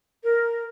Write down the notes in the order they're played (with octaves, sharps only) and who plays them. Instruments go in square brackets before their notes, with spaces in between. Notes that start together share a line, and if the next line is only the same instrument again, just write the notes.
[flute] A#4